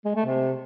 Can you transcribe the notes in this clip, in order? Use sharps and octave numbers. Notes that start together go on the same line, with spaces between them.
G#3
A3
C3